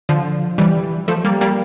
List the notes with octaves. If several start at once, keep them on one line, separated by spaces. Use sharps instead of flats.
D3 F3
E3 G3
F3 A3
G3 A#3
G3 A#3